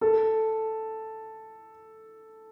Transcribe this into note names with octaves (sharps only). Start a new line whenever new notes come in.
A4